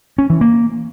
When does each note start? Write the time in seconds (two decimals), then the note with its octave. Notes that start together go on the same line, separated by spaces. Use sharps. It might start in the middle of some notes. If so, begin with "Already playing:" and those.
0.18 C#4
0.30 E3
0.41 A#3